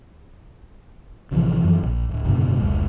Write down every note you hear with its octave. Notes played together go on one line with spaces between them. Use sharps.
A1 C3 E3 F3
F#2 E3 F3
A#1
D1
F#1 G#2 B2 D3
F1 C#2 G#3